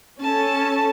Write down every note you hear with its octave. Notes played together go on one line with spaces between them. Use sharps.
C#4 A4 A5